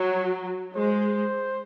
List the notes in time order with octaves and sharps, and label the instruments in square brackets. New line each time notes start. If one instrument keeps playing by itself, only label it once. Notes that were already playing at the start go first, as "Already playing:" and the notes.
Already playing: [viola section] F#3 [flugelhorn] C#5
[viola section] G#3 [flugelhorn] C5